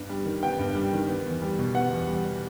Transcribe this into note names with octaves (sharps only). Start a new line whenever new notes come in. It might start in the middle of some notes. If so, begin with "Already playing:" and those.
Already playing: G2 B3
G3
D#3
B3 G5
G2
G3
D#3
B3
E2
G3
B2
B3 F#5
E2
G3
B2